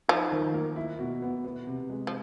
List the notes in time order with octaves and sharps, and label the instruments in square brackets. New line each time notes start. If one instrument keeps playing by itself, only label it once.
[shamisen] F3 [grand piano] D#4
[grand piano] D#3
A#3
E4
B2
B3
B3
C3
G#3
[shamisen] F3